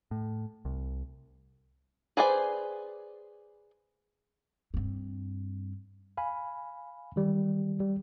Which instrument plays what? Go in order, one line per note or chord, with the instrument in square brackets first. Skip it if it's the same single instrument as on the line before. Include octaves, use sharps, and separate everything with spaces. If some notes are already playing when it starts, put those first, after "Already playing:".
[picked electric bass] A2
C2
[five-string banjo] G#4 B4 C5 D5 G#5
[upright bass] G2 C4
[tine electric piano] F5 G#5 B5
D#3 G3
G3